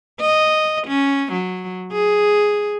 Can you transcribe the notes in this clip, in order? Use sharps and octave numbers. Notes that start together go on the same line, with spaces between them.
D#5
C#4
F#3
G#4